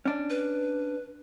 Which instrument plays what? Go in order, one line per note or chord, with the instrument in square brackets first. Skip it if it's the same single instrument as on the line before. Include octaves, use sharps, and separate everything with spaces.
[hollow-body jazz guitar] C#4 D4
[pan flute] B4